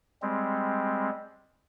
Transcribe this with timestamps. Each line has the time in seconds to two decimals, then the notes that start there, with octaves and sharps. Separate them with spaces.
0.22 G3 G#3 C4